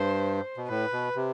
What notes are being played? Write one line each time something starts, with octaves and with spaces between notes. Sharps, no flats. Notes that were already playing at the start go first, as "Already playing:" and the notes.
Already playing: G2 C5
B2
A2 B4
B2
C3